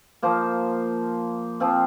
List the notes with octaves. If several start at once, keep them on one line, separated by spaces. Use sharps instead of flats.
F3 A#3 F4 C5
F3 C4 F4